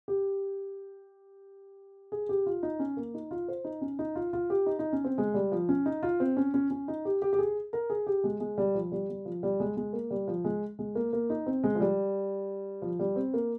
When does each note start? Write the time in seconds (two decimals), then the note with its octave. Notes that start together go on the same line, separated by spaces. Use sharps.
0.08 G4
2.12 G#4
2.29 G4
2.46 F4
2.63 D#4
2.79 C#4
2.97 A#3
3.14 D#4
3.31 F4
3.49 C5
3.64 D#4
3.81 C#4
3.99 D#4
4.15 F4
4.33 F4
4.50 G4
4.66 D#4
4.79 D#4
4.93 C#4
5.04 C4
5.18 G#3
5.34 G3
5.52 F3
5.69 C#4
5.86 D#4
6.03 F4
6.20 C4
6.37 C#4
6.54 C#4
6.71 C#4
6.88 D#4
7.05 G4
7.22 G4
7.33 G4
7.39 G#4
7.73 A#4
7.90 G#4
8.07 G4
8.24 G#3
8.40 G#3
8.58 G3
8.75 F3
8.92 G3
9.09 G3
9.25 F3
9.43 G3
9.60 G#3
9.77 G#3
9.93 A#3
10.10 G3
10.28 F3
10.44 G#3
10.79 G#3
10.95 A#3
11.13 A#3
11.30 D#4
11.46 C4
11.64 G#3
11.75 F3
11.80 G3
12.82 F3
12.99 G3
13.16 C4
13.34 A#3